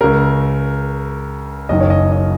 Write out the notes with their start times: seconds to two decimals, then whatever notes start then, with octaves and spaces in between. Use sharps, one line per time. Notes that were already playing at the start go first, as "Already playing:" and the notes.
0.01 C#2 C#3 A#4
1.69 F#1 F#2 D#3 D#5
1.80 C#5
1.90 D#5
2.12 D#5